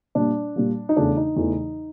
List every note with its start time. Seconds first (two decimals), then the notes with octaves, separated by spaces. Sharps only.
0.15 A#2 G3 A#3 D4
0.56 A#2 G3 A#3
0.89 D#4
0.96 E2 C#3 E3 A3 D4
1.17 D#4
1.36 E2 C#3 E3 A3